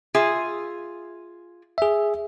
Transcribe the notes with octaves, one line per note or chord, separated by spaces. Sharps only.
F4 G#4 E5
G#4 E5